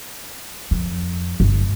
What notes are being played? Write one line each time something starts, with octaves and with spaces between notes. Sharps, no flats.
F2
G1